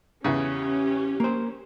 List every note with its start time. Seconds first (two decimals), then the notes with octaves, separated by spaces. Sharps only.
0.24 E2 C#3 C#4 G4
1.20 A#3 C5